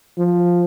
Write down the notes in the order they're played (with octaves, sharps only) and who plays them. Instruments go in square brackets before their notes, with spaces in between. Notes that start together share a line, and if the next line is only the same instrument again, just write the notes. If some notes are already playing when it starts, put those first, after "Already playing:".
[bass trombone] F3